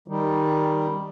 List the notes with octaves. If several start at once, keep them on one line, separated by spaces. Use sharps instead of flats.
D#3 G3